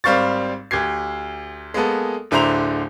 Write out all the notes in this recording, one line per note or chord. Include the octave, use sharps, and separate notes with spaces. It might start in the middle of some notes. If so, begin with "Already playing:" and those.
G#1 G3 C4 F5 C#6 A6
D2 G4 G#6 C7
G#3 A#3 B3 A4
D1 D3 E4 C5 A#5 F7